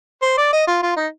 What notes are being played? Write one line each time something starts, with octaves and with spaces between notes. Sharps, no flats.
C5
D5
D#5
F4
F4
D#4